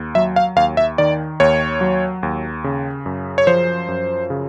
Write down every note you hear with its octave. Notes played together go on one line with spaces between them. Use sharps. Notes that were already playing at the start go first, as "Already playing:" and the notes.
Already playing: D#2
F#3 E5
F5
D#2 F5
E5
D#3 D5
D#2 C#5
F#3
D#2
C#3
F#2
C#5
F3 C5
F#2
C#3